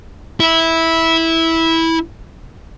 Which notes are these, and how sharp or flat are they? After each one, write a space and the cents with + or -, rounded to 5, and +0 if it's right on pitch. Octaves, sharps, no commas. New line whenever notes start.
E4 -10